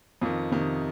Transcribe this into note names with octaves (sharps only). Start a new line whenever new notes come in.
F2 D#3 F4
F2 C3 D#3